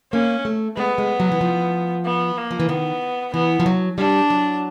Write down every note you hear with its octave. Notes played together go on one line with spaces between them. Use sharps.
A#3 C#4
A3
G#3 B3
G#3
F#3
E3
F3
B3
A#3
F3
E3
D#3 B3
E3 B3
F3
F#3
G3 D4
F#3